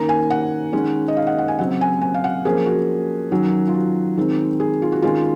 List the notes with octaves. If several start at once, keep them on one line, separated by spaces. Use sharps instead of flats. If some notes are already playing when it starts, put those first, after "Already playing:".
Already playing: D#3 A#3 C#4 A#5
G#5
F#5
D#3 G#3 C#4
D#5
F5
F#5
F#5
G#5
C#3 F#3 C4 F#5
G#5
G#5
F5
F#5
F3 A#3 C#4 G#4
F#4
D#3 F#3 C#4
F4
F#4
D#3 G#3 C4
G#4
F4
F#4
D#3 G#3 C#4 F4